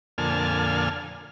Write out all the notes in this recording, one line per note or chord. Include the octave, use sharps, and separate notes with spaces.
F2 A#2 D3 A4 G#5 F6